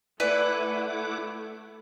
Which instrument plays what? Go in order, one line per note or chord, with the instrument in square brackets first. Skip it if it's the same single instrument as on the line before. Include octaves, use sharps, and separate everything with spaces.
[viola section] A3 [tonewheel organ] E4 F#5 D6 [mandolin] B4 [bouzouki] D5 E5 G#5